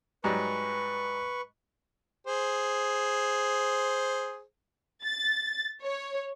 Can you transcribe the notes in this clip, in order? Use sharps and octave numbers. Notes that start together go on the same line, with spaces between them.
G#2 F#3 G3 B4 C#6
G#4 C5
A6
C#5